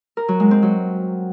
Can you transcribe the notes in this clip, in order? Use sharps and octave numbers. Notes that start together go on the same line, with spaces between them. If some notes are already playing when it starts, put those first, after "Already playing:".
A#4
F#3
G#3
C4
F#3